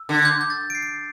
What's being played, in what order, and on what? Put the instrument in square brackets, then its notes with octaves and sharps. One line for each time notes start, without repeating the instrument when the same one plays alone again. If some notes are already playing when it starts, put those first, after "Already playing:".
Already playing: [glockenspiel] E6
[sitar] D3
[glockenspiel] G6
G6
A6
D7
C7
D7
C7